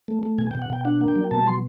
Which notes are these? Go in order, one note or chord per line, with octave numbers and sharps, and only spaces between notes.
A3
A3
B2 G#5
G5
B2
F#5
B2 G5
D4 F#5
A#3
G5
F#3
B2 A5
F#3 C6